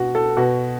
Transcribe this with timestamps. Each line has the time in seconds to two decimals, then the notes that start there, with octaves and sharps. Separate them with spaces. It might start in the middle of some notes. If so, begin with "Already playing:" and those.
Already playing: B2 F#4
0.15 A4
0.37 B2 F#4